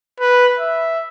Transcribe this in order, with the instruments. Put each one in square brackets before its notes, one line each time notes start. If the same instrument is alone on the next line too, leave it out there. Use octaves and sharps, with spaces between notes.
[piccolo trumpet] B4
E5